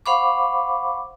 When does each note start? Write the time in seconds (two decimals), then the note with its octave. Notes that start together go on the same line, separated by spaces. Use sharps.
0.06 C5 F5 F#5 B5 C#6 D6